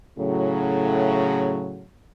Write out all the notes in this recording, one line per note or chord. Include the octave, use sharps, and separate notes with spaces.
A2 C#3 F#3